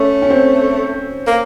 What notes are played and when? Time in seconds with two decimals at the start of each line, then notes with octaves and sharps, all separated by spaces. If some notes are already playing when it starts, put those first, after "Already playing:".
Already playing: A3 C#4
0.22 C#4
0.30 C4
1.27 A#3